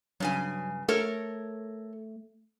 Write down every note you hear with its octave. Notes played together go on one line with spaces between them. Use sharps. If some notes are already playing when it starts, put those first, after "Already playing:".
G2 C#3 F#3 G#5
A3 A4 A#4 C#5